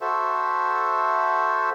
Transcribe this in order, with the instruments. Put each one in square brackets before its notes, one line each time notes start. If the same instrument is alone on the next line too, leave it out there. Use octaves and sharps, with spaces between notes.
[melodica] F#4 A4 C5 E5